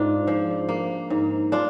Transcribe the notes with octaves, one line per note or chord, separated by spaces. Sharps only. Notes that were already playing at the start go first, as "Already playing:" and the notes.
Already playing: G#2 D4 F4
F3
A#3
G#2
D4 F4